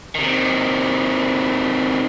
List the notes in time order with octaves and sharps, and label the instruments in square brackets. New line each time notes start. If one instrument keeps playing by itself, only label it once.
[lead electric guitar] C3 D#3